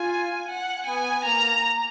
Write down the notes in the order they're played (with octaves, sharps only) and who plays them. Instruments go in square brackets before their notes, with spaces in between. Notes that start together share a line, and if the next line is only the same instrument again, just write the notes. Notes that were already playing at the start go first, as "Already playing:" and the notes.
Already playing: [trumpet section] F4 [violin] G#5
[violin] F#5
[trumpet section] B3 [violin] G#5
[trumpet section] A#3 [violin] A#5